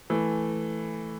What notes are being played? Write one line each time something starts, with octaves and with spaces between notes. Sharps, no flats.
E3 A3